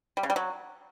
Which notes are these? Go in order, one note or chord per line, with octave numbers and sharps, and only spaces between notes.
G3
C#3
G3
F#3